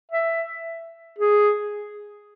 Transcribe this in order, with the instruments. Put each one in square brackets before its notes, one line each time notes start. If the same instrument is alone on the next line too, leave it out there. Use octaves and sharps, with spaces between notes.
[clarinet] E5
G#4